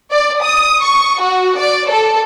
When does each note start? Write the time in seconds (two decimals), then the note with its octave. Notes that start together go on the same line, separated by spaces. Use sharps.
0.11 D5
0.42 D#6
0.82 C#6
1.20 F#4
1.57 D5
1.89 A4